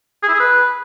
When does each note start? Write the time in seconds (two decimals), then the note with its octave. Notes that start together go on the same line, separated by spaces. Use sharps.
0.23 G#4
0.28 E4
0.34 G#4
0.39 B4